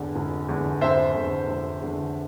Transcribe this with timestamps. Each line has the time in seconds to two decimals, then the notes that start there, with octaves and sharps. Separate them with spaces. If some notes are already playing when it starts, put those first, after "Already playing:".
Already playing: F1 E2 D3
0.16 F1
0.49 E2 D3
0.81 F1 C5 E5
1.15 E2 D3
1.48 F1
1.81 E2 D3